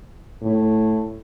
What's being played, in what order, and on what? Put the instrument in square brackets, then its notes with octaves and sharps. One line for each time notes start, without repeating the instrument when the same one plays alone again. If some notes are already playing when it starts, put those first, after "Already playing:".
[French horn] A2